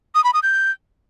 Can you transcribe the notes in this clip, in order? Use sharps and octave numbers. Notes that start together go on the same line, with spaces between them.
D#6
B5
D#6
G6